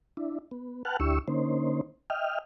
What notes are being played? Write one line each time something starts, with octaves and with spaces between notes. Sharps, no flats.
D4 E4
B3
B4 F#5 G5 A5 F6 F#6
D2 D4 E4 G4 C#6 E6
D3 A#3 C#4 D#4 C5
D#5 E5 G5 F6